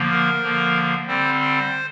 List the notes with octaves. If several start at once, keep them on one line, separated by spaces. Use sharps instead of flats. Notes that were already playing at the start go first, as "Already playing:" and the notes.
Already playing: D3 F3 A#3
A#4
D3 F3 A#3
D3 G3 C4 C5
C5